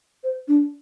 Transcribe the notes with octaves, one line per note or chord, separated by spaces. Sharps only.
C5
D4